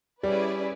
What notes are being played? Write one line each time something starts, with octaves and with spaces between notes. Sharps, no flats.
G3 C#4 E4 G#4 B4 D5